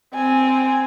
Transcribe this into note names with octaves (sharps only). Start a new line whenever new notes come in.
C4 G#5